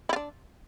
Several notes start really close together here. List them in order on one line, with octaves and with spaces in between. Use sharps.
E4 F4 D4